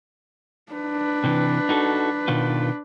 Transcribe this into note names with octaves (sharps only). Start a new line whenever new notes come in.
D4 B4
C3 E3
D#4 F#4 A4
B2 D#3 F4